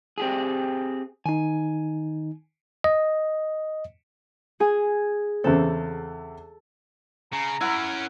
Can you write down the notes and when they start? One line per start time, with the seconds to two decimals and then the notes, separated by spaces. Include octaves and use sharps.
0.18 C4 G4 G#4
1.26 D#3 D#4 G#5
2.84 D#5
4.60 G#4 G#5
5.44 E2 C#3 C4 A4
7.33 C#3 A#5
7.61 C#4 E4 A#4 F#5